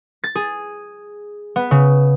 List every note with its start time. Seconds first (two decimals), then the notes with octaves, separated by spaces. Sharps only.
0.24 A6
0.35 G#4
1.56 B3
1.71 C#3